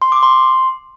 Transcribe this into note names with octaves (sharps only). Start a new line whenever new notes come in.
C6
D6
C6